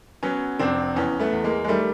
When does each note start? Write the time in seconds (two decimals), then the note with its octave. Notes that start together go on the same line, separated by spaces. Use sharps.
0.23 F#3 B3 C#4
0.59 F1 C4 D4
0.96 E2 B3 C#4
1.20 A3 B3
1.32 E2
1.44 G#3 A#3
1.64 G#3
1.68 D#3 G3 A3